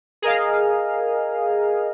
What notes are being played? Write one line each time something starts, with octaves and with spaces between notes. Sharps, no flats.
G#4 A#4 D#5 F5